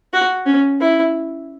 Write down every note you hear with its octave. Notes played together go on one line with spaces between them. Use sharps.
F#4
C#4
E4